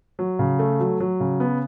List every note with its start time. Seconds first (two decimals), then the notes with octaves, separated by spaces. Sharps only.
0.19 F#3
0.39 C#3
0.59 A3
0.80 F#3
1.00 F#3
1.20 C#3
1.40 B3